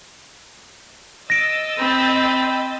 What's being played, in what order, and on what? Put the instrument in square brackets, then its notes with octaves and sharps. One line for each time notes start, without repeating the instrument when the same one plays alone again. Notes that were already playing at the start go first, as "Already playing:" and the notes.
[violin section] D#5 E6 A6 [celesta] A#6 D7
[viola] C4 [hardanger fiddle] G5 B5